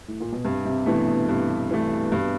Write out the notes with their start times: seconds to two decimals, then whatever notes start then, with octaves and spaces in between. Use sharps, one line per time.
0.08 A2
0.20 A#2
0.32 B2
0.45 G2 C3
0.65 C3
0.86 B2 E3 A3
1.07 B2
1.28 G2 C3
1.71 E3 A3
2.12 G2